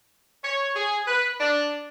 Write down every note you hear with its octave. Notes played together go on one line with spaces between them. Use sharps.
C#5
G#4
B4
D4